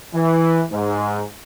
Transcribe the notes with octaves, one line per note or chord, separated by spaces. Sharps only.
E3
G#2